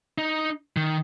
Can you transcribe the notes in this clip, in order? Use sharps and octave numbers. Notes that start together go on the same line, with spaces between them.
D#4
D#3